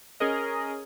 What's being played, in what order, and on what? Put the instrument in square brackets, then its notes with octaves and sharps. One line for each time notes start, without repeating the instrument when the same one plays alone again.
[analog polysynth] C#4 G#4 A#4 D#5